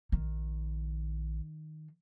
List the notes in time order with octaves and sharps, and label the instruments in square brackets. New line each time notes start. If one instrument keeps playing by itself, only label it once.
[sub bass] A#1 [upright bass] D#3